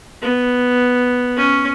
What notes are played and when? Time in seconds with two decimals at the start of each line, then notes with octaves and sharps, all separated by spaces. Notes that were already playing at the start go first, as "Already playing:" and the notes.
0.22 B3
1.37 C#4